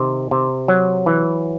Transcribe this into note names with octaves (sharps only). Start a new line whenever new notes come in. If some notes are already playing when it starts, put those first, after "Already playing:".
Already playing: C3 D#3
C3
F#3
E3